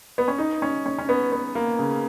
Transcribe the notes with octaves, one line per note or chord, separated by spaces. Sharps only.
B3
C#4
D#4
C#4
C#4
C#4
B3
B3
A#3
C#3